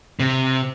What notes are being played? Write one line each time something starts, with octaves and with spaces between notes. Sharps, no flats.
C3